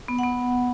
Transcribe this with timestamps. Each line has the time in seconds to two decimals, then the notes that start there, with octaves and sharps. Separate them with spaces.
0.08 B3
0.19 B3 F#5